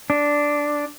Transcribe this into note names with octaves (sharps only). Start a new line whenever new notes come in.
D4